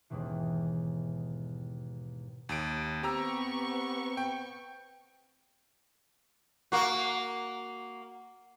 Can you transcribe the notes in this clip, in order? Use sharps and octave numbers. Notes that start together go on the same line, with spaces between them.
D#2 G#2 B2 D#3 E3
D#2 D7
B3 C4 G4 A#5 C#6 E6
G5
A#3 F#4